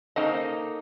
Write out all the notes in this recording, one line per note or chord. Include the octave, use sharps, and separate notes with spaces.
C#3 A#3 D#4 A4 C5 D#5